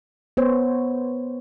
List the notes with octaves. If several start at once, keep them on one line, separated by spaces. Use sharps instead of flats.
B3 C5 C#5